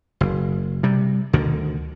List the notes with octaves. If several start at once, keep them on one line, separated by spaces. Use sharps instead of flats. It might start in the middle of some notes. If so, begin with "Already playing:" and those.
F#1
C3 G3
D2 B2 D3 D#3